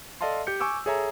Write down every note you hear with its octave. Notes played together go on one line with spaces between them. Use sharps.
A4 D5 D#5 F5 A5 C6
G4 G6 C#7
G#5 C#6 D6 E6 G6
G#4 A4 C#5 E5 G#5 A#5